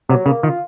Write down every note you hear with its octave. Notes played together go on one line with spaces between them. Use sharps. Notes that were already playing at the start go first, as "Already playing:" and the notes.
C3 F#3
C#3 A#3
D#3 F4